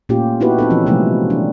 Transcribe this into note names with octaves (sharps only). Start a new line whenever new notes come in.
A#2 A3 C#4 F4 G4
B3 D#4 E4 F#4 G4 B4
C4 D#4 A4
E3 F3 C#4 F4
C3 F3 F#3 G#3 A3 B3
D4